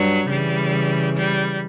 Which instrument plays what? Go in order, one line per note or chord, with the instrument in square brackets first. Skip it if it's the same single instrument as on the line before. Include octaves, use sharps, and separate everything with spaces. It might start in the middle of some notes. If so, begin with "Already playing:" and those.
Already playing: [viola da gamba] G2 [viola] F#3
[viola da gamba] C#3 E3 [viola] G3
[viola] G3